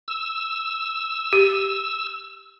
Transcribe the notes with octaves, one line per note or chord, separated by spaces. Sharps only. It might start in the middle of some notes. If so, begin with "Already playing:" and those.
E6
G4